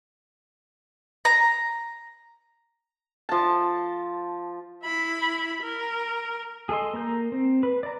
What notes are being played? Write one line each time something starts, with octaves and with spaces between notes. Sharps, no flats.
A#5
F3 A5
E4 B5
A#4
G#4 A4 D#5 C6
A#3 A#4 A#5 G6
C4
B4
D5 A#5